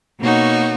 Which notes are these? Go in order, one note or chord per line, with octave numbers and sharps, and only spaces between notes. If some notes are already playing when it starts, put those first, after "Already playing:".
B2 A#3 D#4 F#4 C#5